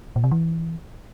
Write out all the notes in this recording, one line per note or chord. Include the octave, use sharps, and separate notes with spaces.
A#2
C3
E3